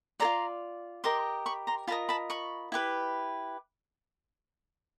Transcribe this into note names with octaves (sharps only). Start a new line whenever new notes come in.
F4 A4 D5 A#5 C6
G4 A#4 D#5 C6 D6
B5 C#6
A#5 C6
F4 A#4 D#5 A5 B5
A5 B5
B5 C#6
E4 G4 B4